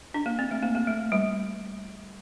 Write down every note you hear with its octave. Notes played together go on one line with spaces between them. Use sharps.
D4
A#3
C4
A3
A#3
A#3
A3
G3